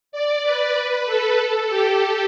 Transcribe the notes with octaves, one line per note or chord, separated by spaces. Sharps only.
D5
B4
B4
A4
G4